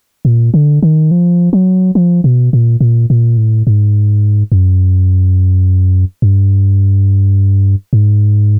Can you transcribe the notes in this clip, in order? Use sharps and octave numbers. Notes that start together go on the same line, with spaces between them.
A#2
D3
D#3
F3
F#3
F3
B2
A#2
A#2
A#2
A2
G#2
F#2
G2
G#2